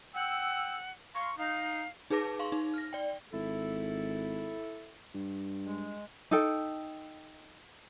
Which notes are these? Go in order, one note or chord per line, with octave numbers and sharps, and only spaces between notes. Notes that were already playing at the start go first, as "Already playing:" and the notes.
F#5 G5 E6
F5 A#5 C6 C#6
D#4 F5
D#4 G#4 B4 A5 D6 A#6
F5 C6 C#6
D#4
F6 A#6
D5 G5
G#1 E4 A4
G2
G#3
D#4 A4 G5